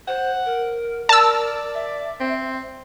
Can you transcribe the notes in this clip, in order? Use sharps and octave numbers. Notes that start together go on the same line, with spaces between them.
C5 F#5
A#4
A#4 D5 A5 E6
E5
C4